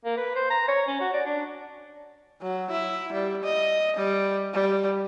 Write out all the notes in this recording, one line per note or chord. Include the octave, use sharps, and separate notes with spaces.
A#3
B4
C5
A#5
C#5
C#4
F#4
D5
D4
F#3
E4
G3
D#5
G3
G3